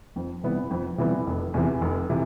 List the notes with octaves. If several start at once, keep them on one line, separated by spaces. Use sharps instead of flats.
F2
C3 E3 G3 B3
F2
C3 E3 G3 B3
F1
E2 C3 E3
F1
C3 E3